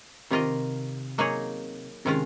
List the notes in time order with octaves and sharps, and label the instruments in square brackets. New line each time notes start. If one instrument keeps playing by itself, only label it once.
[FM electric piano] C3 [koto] D#3 A#3 F4 A#4 D#5
[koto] F#3 A#3 D#4 G#4 C#5
[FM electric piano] C3 [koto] D#3 G#3 C#4 F4